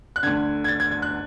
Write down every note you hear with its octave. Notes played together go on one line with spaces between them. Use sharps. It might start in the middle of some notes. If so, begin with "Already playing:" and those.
F#6
D2 D3 G#6
G#6
A6
G#6
G#6
F#6